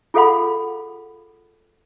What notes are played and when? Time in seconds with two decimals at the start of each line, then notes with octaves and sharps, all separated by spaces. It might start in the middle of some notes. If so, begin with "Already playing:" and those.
0.14 F4 G#4 A4 F5 F#5 B5